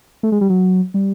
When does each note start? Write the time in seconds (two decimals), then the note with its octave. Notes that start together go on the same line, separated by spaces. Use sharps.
0.23 A3
0.32 G#3
0.41 G3
0.50 F#3
0.94 G3